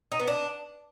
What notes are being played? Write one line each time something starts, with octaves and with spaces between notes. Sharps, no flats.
D#4
B3
D4